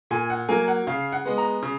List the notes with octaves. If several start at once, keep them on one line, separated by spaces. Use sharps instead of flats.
A#2 G#5
F#5
F#3 A#3 G#5
F#5
C#3 F5
F#5
G#3 B3
A#5
C#3